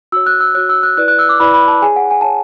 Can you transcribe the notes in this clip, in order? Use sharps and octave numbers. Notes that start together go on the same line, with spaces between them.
F#4 C#5 E6
F#6
E6
F#4 C#5 F#6
E6
F#6
E4 B4 D5 F#6
F#6
E6
D6
E4 B4 D5 B5
B5
A5
G#4 C#5 G#5
F#5
G#5
C#5 A5